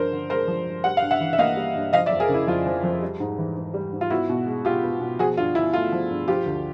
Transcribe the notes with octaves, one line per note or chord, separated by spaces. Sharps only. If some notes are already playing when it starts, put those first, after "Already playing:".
Already playing: G2 F3 A#4 C5
D3
G#3 A#4 C5
F3
G2
G3 F#5
G2 F5
E5 F#5
E3
E5
A#3 D#5 F5
G3
G2
F3 D#5 F5
D5 E5
F2
G#4 A#4
C#3
E4
F2 F4
F3
F2
G3
G#2
E3
G#2
G3
G#2
F4
B3 E4 F#4
B2
G#3
B2 F4 G4
B3
B2
F3 F#4 G#4
G2 F4
D3 E4
A3 F4
F3
G2
F3 F4 G4
D2